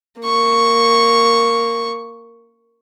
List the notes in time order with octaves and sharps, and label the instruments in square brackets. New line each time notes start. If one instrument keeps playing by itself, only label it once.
[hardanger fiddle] A#3 C#6